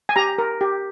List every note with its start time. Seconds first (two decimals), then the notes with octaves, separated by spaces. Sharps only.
0.09 G#5
0.16 G4 A#5
0.38 A#4
0.61 G4